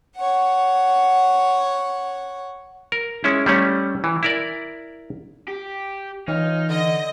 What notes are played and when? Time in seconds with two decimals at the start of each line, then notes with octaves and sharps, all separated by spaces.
0.15 C#5 F#5
2.92 A#4
3.24 G#3 C#4 E4
3.46 G3 A3 C#4
4.04 E3
4.23 E4 A#4 D5
5.48 G4
6.28 E3 D#4 F4 C#5 F6
6.70 D3 D#5